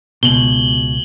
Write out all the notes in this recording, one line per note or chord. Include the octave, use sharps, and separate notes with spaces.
C#2 B2 F#7 G7